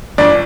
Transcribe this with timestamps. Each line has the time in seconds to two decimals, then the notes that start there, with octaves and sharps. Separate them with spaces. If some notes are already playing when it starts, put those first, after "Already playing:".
0.18 G1 D4